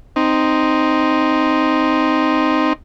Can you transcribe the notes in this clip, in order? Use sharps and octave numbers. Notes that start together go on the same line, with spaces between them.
C4 D#4